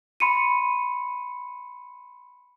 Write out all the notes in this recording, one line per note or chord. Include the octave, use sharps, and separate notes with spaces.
B5 C6 C#7 D#7